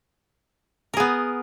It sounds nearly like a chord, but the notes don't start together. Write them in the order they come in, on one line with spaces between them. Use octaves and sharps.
A#4 G#4 B3